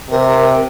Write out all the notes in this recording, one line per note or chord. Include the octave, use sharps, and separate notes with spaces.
C3 A#4